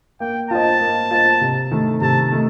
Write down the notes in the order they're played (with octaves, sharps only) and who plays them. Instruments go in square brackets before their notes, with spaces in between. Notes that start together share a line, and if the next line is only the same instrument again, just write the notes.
[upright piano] A#3 [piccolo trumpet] G5
[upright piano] F4 C5 D#5 [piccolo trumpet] A5
[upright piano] A#3
F4 C5 D#5
C3
D#3 A3
[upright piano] C3 [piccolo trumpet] A5
[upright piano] D#3 A3